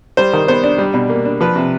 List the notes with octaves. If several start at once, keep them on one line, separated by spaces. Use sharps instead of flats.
G3 C5
D#3
B3 C5
D4
G3
B2
A#3
D4
F3 B4
C3